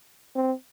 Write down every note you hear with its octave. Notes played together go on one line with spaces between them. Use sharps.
C4